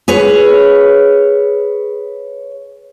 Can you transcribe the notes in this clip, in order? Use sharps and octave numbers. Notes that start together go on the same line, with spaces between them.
G#4 B4 C#5